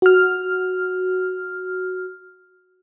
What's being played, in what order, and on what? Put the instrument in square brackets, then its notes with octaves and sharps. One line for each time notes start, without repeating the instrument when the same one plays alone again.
[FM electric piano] F#4 F6